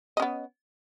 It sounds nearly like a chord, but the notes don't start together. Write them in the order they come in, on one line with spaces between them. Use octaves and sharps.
D#5 C#4 B3